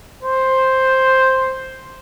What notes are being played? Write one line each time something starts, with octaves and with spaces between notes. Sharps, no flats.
C5